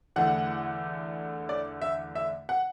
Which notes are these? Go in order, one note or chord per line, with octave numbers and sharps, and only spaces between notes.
E2 D3 A3 D4 F#5
D5
E5
E5
F#5